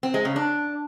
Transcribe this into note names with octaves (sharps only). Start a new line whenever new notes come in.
C4
G#3
C#3
D4